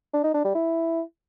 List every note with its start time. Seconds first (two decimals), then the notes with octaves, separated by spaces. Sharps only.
0.14 D4
0.24 D#4
0.34 D4
0.44 G3
0.55 E4